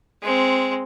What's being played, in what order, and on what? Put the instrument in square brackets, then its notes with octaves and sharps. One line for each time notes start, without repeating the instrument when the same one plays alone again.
[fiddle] G#3 C4